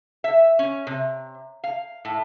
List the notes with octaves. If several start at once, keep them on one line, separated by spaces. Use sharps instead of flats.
E5
C#4
C3
F5
A2